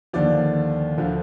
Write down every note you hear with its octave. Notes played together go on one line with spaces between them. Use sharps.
D#2 D3 F3 D5
D2 D3 F3